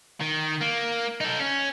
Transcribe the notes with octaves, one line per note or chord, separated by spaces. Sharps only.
D#3
A#3
D#4 A4
C#4